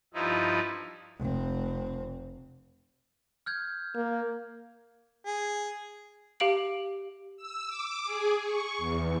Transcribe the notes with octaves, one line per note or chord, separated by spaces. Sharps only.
G2 F3 D#4 E4
F1 C4
F6 G6 G#6
A#3
G#4
G4 F5 D7 F#7
E6
D6
G#4
C#6
E2